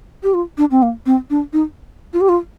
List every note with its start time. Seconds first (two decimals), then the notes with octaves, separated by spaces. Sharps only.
0.23 G4
0.34 F4
0.58 D4
0.71 C4
0.82 A#3
1.06 C4
1.30 D4
1.53 D#4
2.13 F4
2.21 G4
2.29 F4